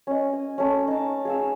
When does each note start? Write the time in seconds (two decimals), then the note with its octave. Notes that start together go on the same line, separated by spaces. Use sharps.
0.07 C#4 D#5
0.33 G#5
0.58 A3 C#4
0.88 D#4 A5
1.25 G#4 F5 E6